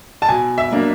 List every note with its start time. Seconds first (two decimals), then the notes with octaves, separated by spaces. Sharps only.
0.22 A5
0.29 B2 G#5
0.58 E5
0.71 F#3 A#3 D4